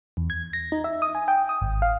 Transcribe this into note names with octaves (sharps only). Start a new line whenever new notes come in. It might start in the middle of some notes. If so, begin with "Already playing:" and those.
E2
G#6
A#6
D#4
E5
D#6
G#5
G5
D#6
G#1
F5